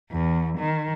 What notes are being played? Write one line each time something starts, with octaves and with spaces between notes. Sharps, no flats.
E2
D#3